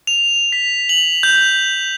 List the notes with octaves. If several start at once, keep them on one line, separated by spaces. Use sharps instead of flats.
F7
B6
F#7
G6